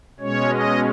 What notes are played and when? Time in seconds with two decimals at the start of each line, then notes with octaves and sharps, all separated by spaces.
0.20 B2 G#3 C#4 C#5
0.50 D#5